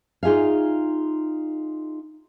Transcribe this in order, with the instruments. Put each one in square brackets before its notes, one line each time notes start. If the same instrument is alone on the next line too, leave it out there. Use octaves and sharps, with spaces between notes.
[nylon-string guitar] D#4 F4 G#4 E5 F5